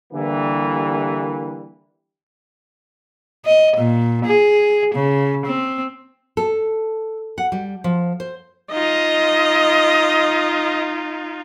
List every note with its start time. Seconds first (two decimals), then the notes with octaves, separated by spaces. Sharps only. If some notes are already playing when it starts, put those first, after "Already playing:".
0.13 D3 E3 G3 A#3
3.45 D#5
3.77 A#2
4.26 G#4
4.95 C#3
5.46 C4
6.37 A4
7.38 F#5
7.52 G3
7.84 F3
8.20 C5
8.72 D#4 F4 D#5